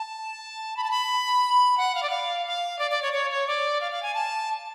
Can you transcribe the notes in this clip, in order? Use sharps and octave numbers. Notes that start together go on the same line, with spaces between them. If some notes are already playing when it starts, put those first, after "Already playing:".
Already playing: A5
B5
A5
B5
F#5
F5
D5
F5
F5
D5
D5
C#5
C#5
C#5
D5
F5
F5
G#5
A5